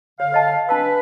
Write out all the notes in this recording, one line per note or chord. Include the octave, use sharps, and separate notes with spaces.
D3 C#5 F5
C#5 D#5 A5
D4 B4 A5 E6